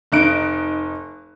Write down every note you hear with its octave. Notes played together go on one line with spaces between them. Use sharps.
F1 D#4 F#6 D7